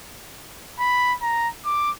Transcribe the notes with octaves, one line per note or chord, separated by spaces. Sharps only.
B5
A#5
D6